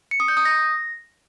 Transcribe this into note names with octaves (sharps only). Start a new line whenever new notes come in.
C#7
D#6
G6
D#6
A#6